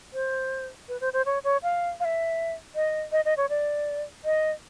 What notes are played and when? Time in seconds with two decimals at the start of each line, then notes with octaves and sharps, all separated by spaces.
0.13 C5
0.89 B4
1.01 C5
1.13 C5
1.26 C#5
1.44 C#5
1.63 F5
2.00 F5
2.05 E5
2.75 D#5
3.12 D#5
3.25 D#5
3.37 C#5
3.49 D5
4.25 D#5